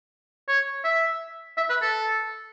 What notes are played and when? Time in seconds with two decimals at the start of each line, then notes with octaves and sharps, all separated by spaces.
0.48 C#5
0.84 E5
1.57 E5
1.69 B4
1.81 A4